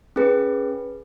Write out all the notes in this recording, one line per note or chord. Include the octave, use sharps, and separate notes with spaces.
C#4 G#4 B4